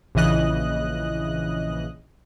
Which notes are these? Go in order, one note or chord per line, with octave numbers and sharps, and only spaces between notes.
A#1 C#3 E3 D#5 F#6